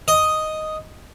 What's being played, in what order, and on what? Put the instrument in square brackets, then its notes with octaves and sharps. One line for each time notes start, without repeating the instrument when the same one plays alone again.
[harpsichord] D#5